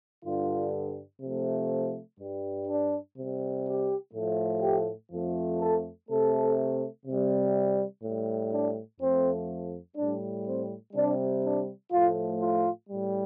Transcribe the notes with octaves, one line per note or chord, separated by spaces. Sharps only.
G2 D3 G3 F4
C3 F3 A3
G2 G3
D4
C3 G3
G4
A2 F3 A3
G4
F2 F3 A3
A4
C3 A3 A4
C3
G3
A2 G3
D4
F2 F3 A3 C4
A2 G3 D4
C4
C3 G3 D4
D4
A2 F3 A3 F4
F4
A2 G3